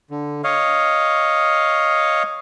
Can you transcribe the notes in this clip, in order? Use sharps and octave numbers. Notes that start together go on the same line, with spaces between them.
D3
C#5 D#5 F5